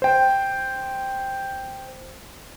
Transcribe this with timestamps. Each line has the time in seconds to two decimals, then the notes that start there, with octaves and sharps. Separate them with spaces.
0.02 C5 G5